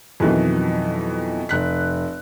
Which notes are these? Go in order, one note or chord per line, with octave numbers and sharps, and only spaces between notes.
F2 B2 D#3 E3 F#3
F1 F#6 B6